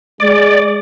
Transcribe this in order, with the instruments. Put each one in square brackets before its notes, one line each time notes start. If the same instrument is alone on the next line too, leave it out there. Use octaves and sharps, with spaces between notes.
[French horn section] G#3 [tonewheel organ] D5